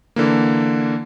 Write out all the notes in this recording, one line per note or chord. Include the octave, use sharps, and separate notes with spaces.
D3 E3 A#3